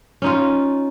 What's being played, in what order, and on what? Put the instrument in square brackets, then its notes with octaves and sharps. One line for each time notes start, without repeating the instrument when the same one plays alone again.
[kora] C#4 D#4 F4